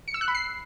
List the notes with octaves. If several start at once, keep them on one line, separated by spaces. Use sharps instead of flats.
C#7
E6
F#6
B5
C7